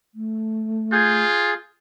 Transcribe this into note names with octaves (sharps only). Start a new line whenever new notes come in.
A3
F4 G#4 G6 G#6